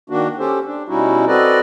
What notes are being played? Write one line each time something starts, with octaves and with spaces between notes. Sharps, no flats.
D#3 A#3 D4 F#4
C#4 G4 A4 C5
D4
B2 G3 C#4 D#4 E4 F#4
C4 F#4 A4 B4 D5 D#5